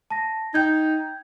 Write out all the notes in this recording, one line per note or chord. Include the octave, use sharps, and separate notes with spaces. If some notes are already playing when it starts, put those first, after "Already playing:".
A5 A#6
D#4 G5 G6 G#6